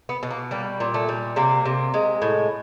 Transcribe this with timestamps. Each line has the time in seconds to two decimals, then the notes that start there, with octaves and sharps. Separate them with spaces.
0.09 B3
0.23 B2
0.31 A#3
0.51 G3 A#3
0.80 A#2
0.94 A3
1.09 G3
1.36 C3 A#3
1.66 C3
1.94 G#3
2.22 A2